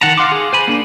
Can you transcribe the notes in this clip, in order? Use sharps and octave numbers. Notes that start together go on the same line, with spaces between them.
D#3 F#5 A5 A#5
F5 F#5 C6 D6
G#4
C5 G#5 B5
A#3 D4